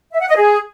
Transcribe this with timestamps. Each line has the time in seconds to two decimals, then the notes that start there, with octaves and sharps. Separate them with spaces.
0.12 E5
0.20 F#5
0.28 D#5
0.36 G#4